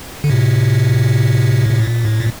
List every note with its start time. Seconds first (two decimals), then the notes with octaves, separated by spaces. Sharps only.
0.24 D3
0.30 A2 C3
1.70 C3
1.80 A#2
2.05 A2
2.20 A#2